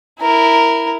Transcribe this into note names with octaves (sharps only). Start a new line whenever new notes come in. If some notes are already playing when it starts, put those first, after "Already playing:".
E4 A#4